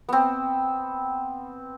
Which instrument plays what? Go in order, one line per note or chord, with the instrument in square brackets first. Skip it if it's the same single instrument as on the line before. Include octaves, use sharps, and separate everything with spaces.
[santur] B3 C4